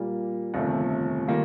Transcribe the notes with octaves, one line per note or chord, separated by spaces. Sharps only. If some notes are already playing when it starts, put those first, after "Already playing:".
Already playing: A#2 G3 A#3
G1 F2 C3 D#3 A3
D#3 G3 A#3 F4